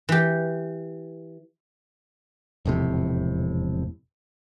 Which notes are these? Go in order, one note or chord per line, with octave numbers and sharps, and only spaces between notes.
E3 G4
E1 F2 A2 C3